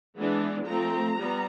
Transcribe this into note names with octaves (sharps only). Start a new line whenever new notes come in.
E3 G#3 B3 D4
F3 A3 C4 A#5
G3 B3